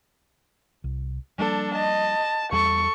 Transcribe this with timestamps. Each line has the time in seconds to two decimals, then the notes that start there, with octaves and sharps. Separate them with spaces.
0.84 C2
1.38 F3 G3 A#3 D4 A4
1.75 D#5 A5
2.52 E2 G3 A4 C#6